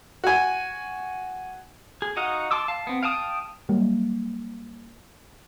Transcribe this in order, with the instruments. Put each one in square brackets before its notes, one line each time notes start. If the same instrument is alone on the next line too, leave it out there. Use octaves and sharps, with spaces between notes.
[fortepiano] F#4 G#5
[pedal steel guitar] G#4
D#4 F#4 D#5 F5 F#5
A5 C6 D6 E6
F5 A5
B3 C4
F5 G5 A5 D#6
[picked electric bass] F#3 G3 A#3